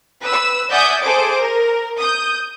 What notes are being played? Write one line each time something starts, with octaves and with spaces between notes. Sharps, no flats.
B4 E6
D5 E5 F#5 G#5 D#6 G6
G#4 A4 C5 D6 D7
A#4
D#6 G6